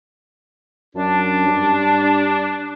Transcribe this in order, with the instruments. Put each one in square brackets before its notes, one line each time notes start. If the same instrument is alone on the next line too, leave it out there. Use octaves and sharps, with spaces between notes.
[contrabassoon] F#2 [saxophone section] D4 [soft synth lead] A5
[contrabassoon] G2